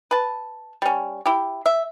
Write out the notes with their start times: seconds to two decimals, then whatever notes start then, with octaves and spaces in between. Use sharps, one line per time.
0.11 B4 A5
0.82 G3 C#4
1.26 E4 G4
1.66 E5